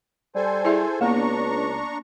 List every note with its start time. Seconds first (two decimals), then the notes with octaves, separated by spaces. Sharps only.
0.35 G3 A4 C5 G#5
0.65 E4 G#4 E5
1.01 C#2 A#3 B3 D4 A#5 C#6